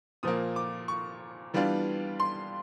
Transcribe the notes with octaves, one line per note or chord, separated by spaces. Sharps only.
A#2 F3 A#3 D#6
D6
C#6
E3 G3 B3 D4 F4
C6